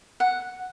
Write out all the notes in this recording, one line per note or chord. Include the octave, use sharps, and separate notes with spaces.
F#5